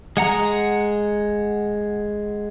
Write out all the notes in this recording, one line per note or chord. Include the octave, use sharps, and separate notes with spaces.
G#3 F#5 A#5